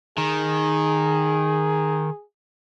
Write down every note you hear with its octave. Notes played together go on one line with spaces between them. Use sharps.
D#3 G#4